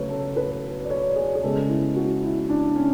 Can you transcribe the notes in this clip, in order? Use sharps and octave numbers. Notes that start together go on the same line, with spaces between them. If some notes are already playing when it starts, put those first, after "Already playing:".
Already playing: C#3 F#3 A3 B4 C#5
A4
B4
D5
C#5
G#4
G#4
C#3 G#3 B3 A4
E4
F#4
E4
D4
C#4